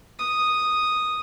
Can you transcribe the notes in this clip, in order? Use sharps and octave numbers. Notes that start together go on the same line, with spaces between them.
D#6